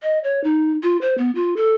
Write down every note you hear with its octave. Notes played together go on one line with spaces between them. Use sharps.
D#5
C#5
D#4
F4
C5
B3
F4
A4